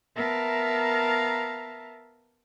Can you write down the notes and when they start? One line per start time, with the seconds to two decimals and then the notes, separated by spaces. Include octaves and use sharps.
0.15 B3 A#4 E5 F5 A5 A#5